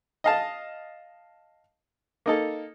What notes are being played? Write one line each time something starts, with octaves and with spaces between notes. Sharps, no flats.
D#5 F5 A5
A#3 D#4 A4